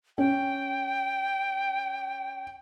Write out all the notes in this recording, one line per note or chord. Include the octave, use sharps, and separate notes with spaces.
C#4 G5